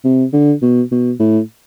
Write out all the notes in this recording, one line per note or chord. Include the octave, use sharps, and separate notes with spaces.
C3
D3
B2
B2
A2